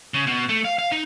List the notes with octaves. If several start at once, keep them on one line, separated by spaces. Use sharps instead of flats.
C#3
B2
A3
F5
F5
D#4